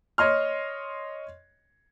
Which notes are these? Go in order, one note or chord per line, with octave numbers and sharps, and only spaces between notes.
C#5 D#5 C6 F6